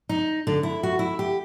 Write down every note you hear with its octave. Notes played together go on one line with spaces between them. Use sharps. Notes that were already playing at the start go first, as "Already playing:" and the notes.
D#4
D3
E4
F#4
E4
G4